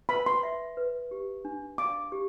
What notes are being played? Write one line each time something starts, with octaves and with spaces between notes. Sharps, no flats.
B4 B5
C6
E5
B4
G4
D4
F5 D6
G4